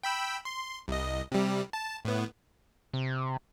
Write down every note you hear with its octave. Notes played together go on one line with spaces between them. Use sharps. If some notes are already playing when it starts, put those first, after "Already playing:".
G5 B5 E6
C6
C2 D#5
C3 G3
A5
A2 B3
C3